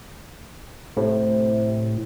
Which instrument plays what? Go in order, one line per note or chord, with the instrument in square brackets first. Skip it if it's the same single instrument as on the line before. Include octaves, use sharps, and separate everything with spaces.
[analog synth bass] A2 [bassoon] C3